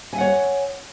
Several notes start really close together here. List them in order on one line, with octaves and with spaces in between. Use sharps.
G#5 E5 F#5 C#5